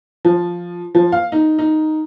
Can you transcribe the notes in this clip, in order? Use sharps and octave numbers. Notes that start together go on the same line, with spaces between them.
F3
F3
F5
D#4
D#4